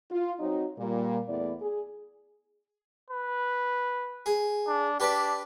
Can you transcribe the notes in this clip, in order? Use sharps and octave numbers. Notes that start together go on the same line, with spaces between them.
F4
F#3 C4 D#4
A#2 G3 A#3
E2 A3 B3 E4 D5
G#4
B4
G#4
D4
D4 G4 B4 D5